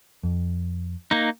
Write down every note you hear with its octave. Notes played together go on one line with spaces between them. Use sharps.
F2
A#3 D#4